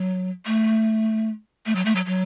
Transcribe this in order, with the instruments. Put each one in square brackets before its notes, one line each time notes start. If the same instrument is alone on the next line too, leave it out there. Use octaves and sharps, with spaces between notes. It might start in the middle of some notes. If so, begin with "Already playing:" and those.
Already playing: [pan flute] F#3
A3
A3
F#3
A3
F#3
F#3